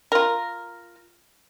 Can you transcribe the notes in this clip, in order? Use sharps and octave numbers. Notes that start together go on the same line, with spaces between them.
F4 A#4